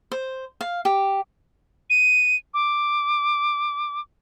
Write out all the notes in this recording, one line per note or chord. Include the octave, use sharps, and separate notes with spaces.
C5
F5
G4
D#7
D6